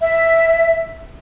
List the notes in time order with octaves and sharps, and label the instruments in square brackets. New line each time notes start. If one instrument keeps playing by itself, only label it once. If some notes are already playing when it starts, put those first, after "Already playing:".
[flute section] E5